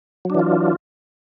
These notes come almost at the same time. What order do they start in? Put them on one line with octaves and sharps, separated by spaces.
F#3 D4 E3 F4